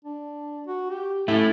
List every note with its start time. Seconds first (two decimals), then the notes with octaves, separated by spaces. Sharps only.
0.05 D4
0.67 F#4
0.90 G4
1.28 A3 C#4 E4